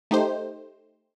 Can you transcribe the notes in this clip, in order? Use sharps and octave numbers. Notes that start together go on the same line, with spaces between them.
A3 D#4 G4 C5